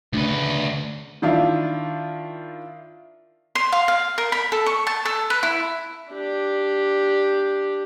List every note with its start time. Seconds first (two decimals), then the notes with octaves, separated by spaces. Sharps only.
0.13 D2 C#3 A3 D4 B4
1.22 D#3 D4 E4 F4
3.55 C6
3.72 F5
3.88 F5
4.18 A#4
4.32 B5
4.52 A4
4.66 C#6
4.87 A5
5.05 A4
5.30 B4
5.43 E4
6.11 D4 G4